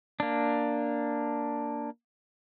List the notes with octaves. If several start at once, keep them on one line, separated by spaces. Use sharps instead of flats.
A#3 D4